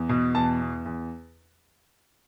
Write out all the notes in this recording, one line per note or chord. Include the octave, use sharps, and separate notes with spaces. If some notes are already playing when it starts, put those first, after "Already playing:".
Already playing: E2
B2
E2 A5
E2
E2